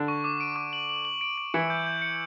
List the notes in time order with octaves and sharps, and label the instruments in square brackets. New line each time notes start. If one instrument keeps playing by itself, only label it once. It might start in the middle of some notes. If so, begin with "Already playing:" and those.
Already playing: [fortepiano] D3 D4
[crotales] C#6
D6
D7
D6
F#7
F#7
F#7
D7
D7
[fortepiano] E3 E4 [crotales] C#7
[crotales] G6
G6
C#7